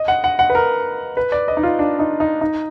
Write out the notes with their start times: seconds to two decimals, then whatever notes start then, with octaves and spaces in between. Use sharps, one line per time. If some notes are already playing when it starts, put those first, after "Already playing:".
Already playing: D#5
0.08 F#5
0.24 F#5
0.39 F#5
0.50 B4
0.55 A#4
1.17 B4
1.32 D5
1.48 D#5
1.57 D#4
1.63 F4
1.79 D4
1.99 D#4
2.20 D#4
2.41 D#4